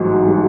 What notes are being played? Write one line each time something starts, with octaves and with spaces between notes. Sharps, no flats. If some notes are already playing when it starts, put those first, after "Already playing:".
Already playing: A1 G#2 F#3
F#3